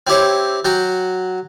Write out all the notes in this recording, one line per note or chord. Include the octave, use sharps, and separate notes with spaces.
C4 E4 G4 C#5
F#3 F#4 G5